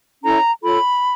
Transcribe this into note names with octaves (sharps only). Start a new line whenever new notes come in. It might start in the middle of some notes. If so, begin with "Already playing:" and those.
C#4 E4 A4 C#5 A#5
F4 A4 C#5 B5